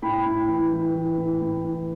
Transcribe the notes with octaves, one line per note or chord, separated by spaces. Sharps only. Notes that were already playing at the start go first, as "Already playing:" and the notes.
A2 G5 B5
A2
E3
E3
E3
A2
A2
E3